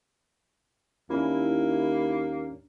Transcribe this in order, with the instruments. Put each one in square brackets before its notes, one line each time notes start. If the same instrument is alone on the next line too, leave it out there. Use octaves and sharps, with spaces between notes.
[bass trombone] D#2 [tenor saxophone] A#3 [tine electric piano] C#4 D4 [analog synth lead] E4